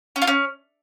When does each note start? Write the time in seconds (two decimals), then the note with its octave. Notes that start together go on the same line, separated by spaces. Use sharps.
0.16 C#4
0.22 F4
0.27 C#4